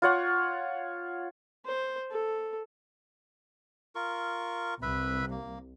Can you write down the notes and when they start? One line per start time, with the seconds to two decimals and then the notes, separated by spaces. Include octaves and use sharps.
0.02 F4 C#5 F#5
1.66 C5
2.11 A4
3.95 F4 A#4 C#6
4.82 C2 B4 E5 B5
5.31 A#3